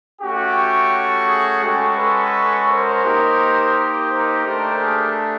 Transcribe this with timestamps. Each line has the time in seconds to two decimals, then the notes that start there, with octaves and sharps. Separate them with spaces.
0.22 A3 C#4 F#4 G4
1.27 G#4
1.63 G#3 C#4 F#4 G4 A4
1.98 A4 B4
2.69 A#4 C5
3.04 A#3 D#4 G4
4.09 A#4 C5
4.44 A3 D4 G4 A#4 C5
4.79 G#4 A#4